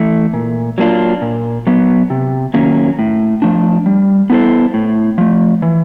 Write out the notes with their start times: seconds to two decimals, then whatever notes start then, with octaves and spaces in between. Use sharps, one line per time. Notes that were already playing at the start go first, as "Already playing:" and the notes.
Already playing: E3 A3
0.33 A#2
0.78 F#3 A#3 D4 F4
1.22 A#2
1.67 F#3 B3
2.10 C3
2.54 D#3 F#3 A#3 C#4
2.99 A2
3.42 F3 A3 D4
3.86 G3
4.30 B3 E4 A4 C5
4.74 A2
5.18 F3 A3
5.62 E3